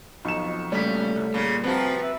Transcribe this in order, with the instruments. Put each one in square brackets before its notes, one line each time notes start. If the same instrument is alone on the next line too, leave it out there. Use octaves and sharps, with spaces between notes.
[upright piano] B1 E7 [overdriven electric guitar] F2 [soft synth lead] C#6
[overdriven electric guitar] A#2 C#3 [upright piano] G3 B6 [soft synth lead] A3 [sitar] C#4
[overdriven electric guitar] C2
[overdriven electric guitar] A#2 [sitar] C#3
[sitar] C3 F3 F#4 [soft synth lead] C4 [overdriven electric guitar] B4
[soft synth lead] E5